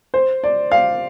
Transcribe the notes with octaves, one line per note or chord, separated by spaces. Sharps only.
C5
D5
F5